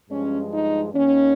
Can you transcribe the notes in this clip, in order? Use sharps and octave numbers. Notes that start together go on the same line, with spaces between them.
G2 F3 G#3 C#4
D#4
D#2 D#3 A#3 C#4